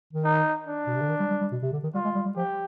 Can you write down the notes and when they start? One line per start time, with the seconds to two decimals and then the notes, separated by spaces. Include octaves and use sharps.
0.13 D#3
0.24 D#4
0.66 D4
0.87 B2
0.94 C3
1.02 D3
1.09 D#3
1.20 G3
1.30 G3
1.41 G3
1.52 B2
1.63 C3
1.73 D3
1.84 D#3
1.94 G3 F4
2.05 G#3
2.15 G3
2.25 G3
2.36 F3 G4